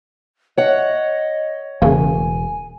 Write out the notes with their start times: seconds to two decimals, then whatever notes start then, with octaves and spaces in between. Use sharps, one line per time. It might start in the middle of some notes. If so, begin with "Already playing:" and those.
0.58 C#5 D#5 F#5
1.82 E1 C#3 E3 A3 A#3 G#5